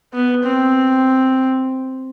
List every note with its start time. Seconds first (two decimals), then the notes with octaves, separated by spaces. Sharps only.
0.14 B3
0.44 C4